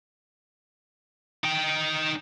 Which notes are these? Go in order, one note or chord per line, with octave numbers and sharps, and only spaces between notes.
D#4 G5